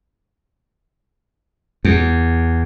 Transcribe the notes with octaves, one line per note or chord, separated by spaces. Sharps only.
E2